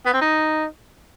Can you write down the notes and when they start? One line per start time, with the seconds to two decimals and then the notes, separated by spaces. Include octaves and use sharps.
0.06 B3
0.13 C4
0.21 D#4